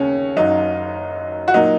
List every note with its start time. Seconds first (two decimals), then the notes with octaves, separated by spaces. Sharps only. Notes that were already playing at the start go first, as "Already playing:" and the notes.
Already playing: D#2 C#3 C#4
0.36 F#1 F#2 F#3 D#4
1.48 F#4
1.54 A#2 F#3 A#3 D#4